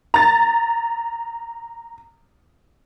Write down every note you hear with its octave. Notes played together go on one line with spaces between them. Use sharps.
A#5 A6